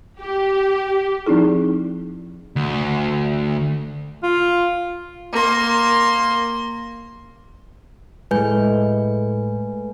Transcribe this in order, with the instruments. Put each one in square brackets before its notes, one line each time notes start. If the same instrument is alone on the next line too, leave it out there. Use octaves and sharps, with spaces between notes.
[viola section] G4
[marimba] F3 C4 D#4 E4 G#4
[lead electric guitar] D2
[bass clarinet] F4
[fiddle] A#3 C6
[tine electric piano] A2 [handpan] G#3 A3 [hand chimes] B4 G#5 G6